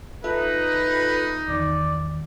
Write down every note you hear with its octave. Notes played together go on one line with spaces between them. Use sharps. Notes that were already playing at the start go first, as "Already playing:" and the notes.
D#4 F4 A4 B4 E5
E2 D#3 D5